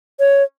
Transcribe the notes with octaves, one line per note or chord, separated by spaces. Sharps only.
C#5